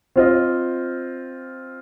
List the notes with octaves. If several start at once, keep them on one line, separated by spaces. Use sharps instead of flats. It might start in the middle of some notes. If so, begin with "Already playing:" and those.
C4 F4 C5 D#5